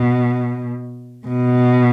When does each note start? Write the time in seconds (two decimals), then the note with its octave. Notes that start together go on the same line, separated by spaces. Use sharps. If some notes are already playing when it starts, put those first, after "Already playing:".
Already playing: B2
1.27 B2